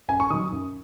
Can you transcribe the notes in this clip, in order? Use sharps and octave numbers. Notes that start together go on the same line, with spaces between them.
F#2 G#5
C#6
D#3 F#3 D#6
F#2